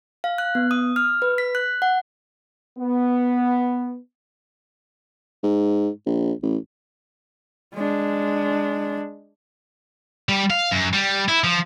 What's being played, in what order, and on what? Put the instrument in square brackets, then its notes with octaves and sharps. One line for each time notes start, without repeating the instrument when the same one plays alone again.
[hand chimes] F5
F#6
B3
D#6
F6
B4
B6
F#6
F#5
[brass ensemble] B3
[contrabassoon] G#2
A#1
A1
[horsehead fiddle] G#3 D4
[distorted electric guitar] G3
F5
F#2
G3
E4
F3